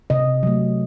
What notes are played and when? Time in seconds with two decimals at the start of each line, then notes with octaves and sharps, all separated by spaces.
0.10 C3 D#5
0.43 F#3 A3